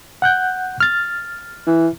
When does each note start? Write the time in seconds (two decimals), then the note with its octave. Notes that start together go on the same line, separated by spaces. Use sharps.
0.22 F#5 F#6 G6
0.80 F6 A6
1.67 E3